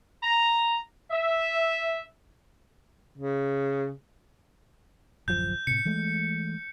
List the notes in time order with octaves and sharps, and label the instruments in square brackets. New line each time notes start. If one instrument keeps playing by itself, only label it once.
[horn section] A#5
E5
[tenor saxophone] C#3
[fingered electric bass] D1 F#2 F3 [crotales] G6
[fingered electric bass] A2 C3 [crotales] C#7
[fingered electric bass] E3 G#3 A3